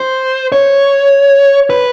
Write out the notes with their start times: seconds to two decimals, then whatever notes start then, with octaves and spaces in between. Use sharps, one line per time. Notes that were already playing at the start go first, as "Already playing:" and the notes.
Already playing: C5
0.52 C#5
1.70 B4